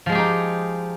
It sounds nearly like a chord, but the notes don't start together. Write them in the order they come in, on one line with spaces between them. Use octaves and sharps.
F3 G#3 G#4 G4 D#4